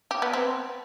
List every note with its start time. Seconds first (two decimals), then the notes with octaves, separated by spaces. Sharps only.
0.11 G4
0.22 B3
0.33 C4